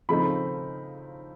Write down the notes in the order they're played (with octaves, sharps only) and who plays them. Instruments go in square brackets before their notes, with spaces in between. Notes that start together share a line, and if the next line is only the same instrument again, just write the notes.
[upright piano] C#3 F3 A3 C4 D#4 B5